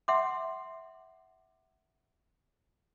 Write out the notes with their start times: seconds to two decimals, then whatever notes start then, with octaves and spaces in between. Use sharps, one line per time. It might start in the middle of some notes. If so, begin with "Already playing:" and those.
0.08 E5 F#5 C6 D6